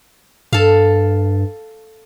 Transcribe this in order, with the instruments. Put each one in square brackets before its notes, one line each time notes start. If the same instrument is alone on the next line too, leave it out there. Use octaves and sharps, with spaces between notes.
[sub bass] G2 [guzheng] A4 F5